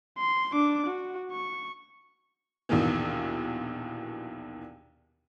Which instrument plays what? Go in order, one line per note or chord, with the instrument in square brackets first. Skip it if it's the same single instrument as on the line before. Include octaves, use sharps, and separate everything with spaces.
[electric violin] C6
D4 D6
F#4
C#6
[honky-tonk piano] A#1 D#2 B2 D#3 E3